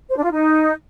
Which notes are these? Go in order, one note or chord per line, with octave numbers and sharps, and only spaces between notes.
C5
D4
F4
D#4